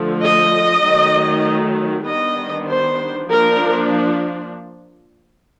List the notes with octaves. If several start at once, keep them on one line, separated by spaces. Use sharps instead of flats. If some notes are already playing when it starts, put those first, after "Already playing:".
Already playing: D3 F3 A3
D#5
D#3 F#3 A3
D#3 G3 B3 D4 D#5
C5
F3 A#3 D4 A#4